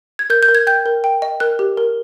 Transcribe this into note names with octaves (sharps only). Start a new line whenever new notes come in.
G#6
A#4 G6
G6
A#4
G#6
G5 G6
A#4
G5
D#5
A#4 F#6
G4
A#4